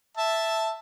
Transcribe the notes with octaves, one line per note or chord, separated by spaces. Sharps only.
E5 A5